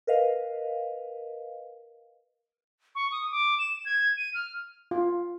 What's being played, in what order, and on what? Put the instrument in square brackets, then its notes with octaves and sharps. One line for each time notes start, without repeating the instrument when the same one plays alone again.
[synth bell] A#4 B4 D#5 F5
[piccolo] C#6
D#6
D6
E7
G#6
D#7
F6
[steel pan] F4